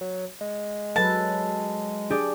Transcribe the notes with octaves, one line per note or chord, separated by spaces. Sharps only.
F#3
G#3
F#3 A4 B4 A5
D4 G4 G#4 D5